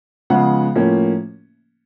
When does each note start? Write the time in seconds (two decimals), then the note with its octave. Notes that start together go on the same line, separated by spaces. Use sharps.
0.30 C#3 F3 G#3 B3 F#5
0.75 A2 F3 A#3 C#4